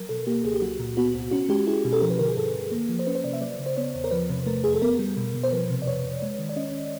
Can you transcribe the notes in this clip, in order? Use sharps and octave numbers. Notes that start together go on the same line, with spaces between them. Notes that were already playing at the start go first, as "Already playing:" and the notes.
Already playing: F#3 A#4
B2 A4
A#3 G4
C#2 G#4
G4
F#3 F#4
A#2
B3 F#4
C2
C#4 F#4
G#3 G4
E4 G#4
B2
A4
F3 A#4
B4
D3 A#4
G#4
G2 A4
G2
A#3
F3
C5
C#4 B4
C5
C3 D5
E5
F#3 D5
C#3
C5
B3 C#5
E2
A#4
F3 B4
C3
A3 A#4
F2 G#4
A4
B3 A#4
G3
B2
B2
C5
F3 B4
C3
D5
F2 C#5
F2
G#3
D#3
D5
C#4 D#5